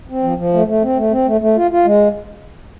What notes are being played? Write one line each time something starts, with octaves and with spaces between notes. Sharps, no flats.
C4
F3
F3
A3
A3
C4
A3
C4
A3
A3
F4
F4
G#3